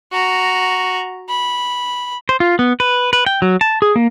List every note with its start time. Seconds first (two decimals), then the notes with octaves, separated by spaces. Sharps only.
0.12 F#4 A#5
1.29 B5
2.29 C5
2.40 F4
2.59 B3
2.80 B4
3.13 B4
3.26 G5
3.42 F#3
3.61 A5
3.82 G#4
3.96 A#3